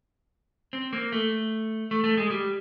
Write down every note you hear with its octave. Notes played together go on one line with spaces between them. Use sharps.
C4
A#3
A3
A3
A3
G#3
G3